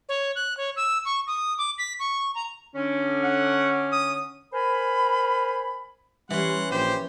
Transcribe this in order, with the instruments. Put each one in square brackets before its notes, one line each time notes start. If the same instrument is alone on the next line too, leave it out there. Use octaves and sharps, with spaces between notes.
[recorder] C#5
F#6
C#5
E6
C#6
D#6
D6
B6
C#6
A#5
[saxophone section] D3 C#4
[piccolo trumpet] F#5
D#6
[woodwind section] A#4 C5 G#5 B5
[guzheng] E3 C#4 [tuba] G3 [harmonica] F#5 C6
[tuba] A#1 [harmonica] G4 [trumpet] C5